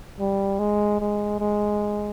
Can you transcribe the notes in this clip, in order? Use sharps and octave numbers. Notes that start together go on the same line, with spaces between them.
G3
G#3
G#3
G#3